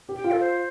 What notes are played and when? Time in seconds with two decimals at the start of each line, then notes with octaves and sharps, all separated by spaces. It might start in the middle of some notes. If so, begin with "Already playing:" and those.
0.09 G4
0.16 G5
0.24 F4
0.32 A4
0.40 C5